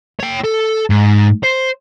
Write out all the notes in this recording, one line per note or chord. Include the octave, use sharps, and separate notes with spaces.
C#5 G5
A4
G#2
C5